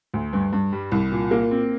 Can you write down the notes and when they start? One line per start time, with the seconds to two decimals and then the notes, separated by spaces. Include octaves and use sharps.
0.14 D2
0.33 G2
0.53 G2
0.72 G3
0.92 C2
1.12 A#2
1.31 A#3
1.51 C4